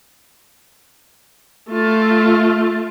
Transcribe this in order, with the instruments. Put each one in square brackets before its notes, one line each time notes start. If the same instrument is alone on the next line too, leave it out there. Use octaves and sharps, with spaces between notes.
[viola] A3 F4